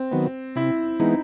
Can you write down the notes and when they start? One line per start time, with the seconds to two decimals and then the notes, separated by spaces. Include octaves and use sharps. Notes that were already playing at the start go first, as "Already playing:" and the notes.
Already playing: C4
0.12 D#3 F#3 B3
0.56 C3 E4
0.99 E3 G#3 B3 D#4